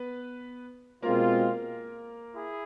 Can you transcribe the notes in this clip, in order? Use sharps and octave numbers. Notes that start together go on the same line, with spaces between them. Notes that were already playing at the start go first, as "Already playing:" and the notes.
Already playing: B3 B4
B2 G#3 A#3 C4 F4 A#4
E4 G#4